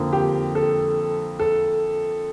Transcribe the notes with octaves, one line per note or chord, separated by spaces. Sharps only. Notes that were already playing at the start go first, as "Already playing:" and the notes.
Already playing: F2 D3 F3 A#3
G4
A4
A4